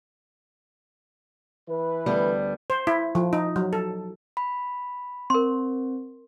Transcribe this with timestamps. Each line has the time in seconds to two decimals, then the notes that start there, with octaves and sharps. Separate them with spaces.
1.69 E3 B4
2.06 D2 G3 B3
2.70 C5
2.87 E4
3.15 F3
3.33 D#4
3.56 F#3
3.73 A4
4.37 B5
5.30 C4 A#4 C6